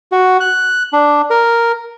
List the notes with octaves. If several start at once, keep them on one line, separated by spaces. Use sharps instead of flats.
F#4
F#6
D4
A#4